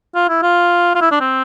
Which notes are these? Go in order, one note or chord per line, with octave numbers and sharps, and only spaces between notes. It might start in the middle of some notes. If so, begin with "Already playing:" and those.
F4
E4
F4
F4
E4
D4
C4